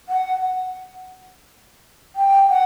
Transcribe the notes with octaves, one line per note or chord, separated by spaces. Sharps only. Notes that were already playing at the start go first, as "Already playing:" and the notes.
F#5
G5
F#5